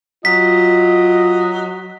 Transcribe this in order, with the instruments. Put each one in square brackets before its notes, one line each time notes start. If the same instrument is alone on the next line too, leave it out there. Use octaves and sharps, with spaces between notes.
[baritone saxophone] F#3 [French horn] F4 [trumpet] D#5 [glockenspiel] B6